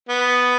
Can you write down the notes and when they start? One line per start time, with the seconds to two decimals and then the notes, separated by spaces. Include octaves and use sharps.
0.09 B3